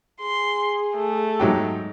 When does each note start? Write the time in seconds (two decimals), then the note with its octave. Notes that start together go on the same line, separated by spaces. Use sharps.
0.21 G#4 C6
0.96 A3
1.40 G#2 F#3 G4